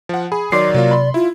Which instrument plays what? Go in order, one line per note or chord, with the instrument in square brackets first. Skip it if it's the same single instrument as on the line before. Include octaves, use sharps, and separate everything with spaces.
[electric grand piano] F3 F#5
[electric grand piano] G#4 [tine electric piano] B5
[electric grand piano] D#3 F#3 [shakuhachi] D5 [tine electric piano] C6 D6 C7
[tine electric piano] C3 [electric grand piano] F#3 A#3 F4
[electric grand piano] B5 C6
[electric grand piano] E4 [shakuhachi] F4